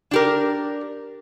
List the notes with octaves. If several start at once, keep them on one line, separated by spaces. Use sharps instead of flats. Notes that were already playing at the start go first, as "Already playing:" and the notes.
D4 G4 A#4